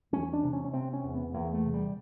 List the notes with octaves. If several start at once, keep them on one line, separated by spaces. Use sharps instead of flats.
E2 C#4
D4
C3
C#4
C#4
C3 C4
C#4
E2
B3
E2 A#3
A3
C3
G3